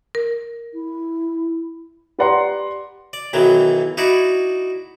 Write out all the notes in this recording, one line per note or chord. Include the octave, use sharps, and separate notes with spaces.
A#4
E4
G4 B4 D5 F#5 A#5 C6
D5
B1 D#3 E3 F#3
D#4 E4 F#4 D5